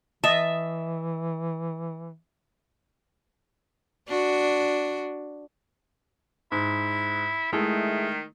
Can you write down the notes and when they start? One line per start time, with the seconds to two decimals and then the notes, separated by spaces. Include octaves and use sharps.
0.24 E3 D#5 E5 A5
4.08 D4 F#4
6.52 G#2 E4
7.53 D#3 G#3 A3 E4